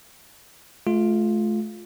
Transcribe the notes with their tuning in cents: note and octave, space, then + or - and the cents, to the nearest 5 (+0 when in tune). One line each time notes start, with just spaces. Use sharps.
A3 -40 F4 +5